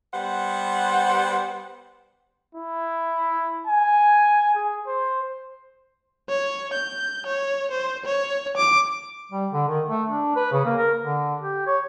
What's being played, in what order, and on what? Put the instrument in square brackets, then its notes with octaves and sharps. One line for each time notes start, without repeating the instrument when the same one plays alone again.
[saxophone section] G3 B3 C5 F#5
[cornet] E4
G#5
G#4
C5
[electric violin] C#5
G6
C#5
C5
C#5
D6
[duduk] G3
D3
D#3
A3
D4
B4
C#3
A#3
A#4
D3
G4
C#5